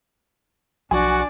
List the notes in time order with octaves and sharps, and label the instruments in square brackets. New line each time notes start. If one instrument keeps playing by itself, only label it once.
[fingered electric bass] B1 F3 [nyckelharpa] D4 D5 [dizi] F#4 [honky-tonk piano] G#5